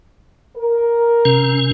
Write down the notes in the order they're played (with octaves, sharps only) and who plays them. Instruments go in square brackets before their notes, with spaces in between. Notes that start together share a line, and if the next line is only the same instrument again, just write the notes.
[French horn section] A#4
[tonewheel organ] C3 C#4